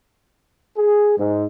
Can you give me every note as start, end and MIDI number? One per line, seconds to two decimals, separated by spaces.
0.77 1.16 68
1.18 1.45 44